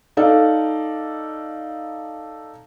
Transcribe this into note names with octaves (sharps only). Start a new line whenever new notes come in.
D#4 A4 D5 F5